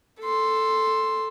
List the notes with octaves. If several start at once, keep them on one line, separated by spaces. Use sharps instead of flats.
A4 C6